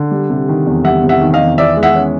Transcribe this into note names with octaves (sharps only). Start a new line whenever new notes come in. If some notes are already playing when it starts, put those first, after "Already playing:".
Already playing: D3
G3
C3
D#3
E2
G3 E5 F#5
C3
E5 F#5
D#3
D#5 F5
E2
E3 D5 E5
G#3
E5 F#5
C#4